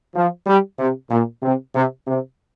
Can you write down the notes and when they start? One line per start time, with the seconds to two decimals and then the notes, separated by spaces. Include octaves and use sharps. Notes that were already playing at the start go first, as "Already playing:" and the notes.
0.15 F3
0.47 G3
0.79 C3
1.11 A#2
1.42 C3
1.74 C3
2.07 C3